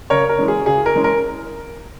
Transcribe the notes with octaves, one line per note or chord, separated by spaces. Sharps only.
C#3 A#4 C#5
A#4
E3 G#3 C#4
G#4
C#3 G#4
A#4
E3 G#3 C#4
A#4